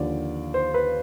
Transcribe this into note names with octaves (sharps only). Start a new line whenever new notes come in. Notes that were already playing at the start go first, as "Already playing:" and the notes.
Already playing: D#2 D3 F3 D5
C5
B4